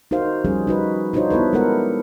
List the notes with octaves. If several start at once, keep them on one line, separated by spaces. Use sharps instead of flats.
D#4 F#4 A#4 C5 F5
F3 G3 C#4 G#4
D#4 F#4 B4
D4 D#4 F4 F#4 C5 C#5
B3 E4 A4 B4
G#3 B3 A4 A#4 F#5